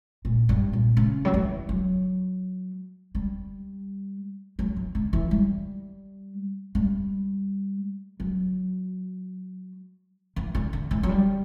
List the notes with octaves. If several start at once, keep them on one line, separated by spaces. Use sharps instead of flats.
A#2
G2
A#2
C#3
F#3
E3
F#3
G3
F#3
E3
D3
E3
G3
G3
F#3
E3
D3
D3
E3
F#3
G3